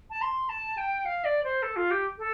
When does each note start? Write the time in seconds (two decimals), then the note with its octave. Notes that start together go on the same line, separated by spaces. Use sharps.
0.10 A5
0.22 C6
0.49 A5
0.77 G5
1.05 F5
1.24 D5
1.44 C5
1.62 A4
1.76 F4
1.91 G4
2.18 A4